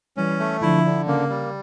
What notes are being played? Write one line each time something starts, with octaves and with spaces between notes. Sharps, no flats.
E3 G3 C#4
A3
D3 F3 E4
D3
C#3 A#3
G3